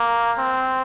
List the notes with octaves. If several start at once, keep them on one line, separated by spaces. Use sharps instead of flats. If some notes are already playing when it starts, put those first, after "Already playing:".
Already playing: A#3
C4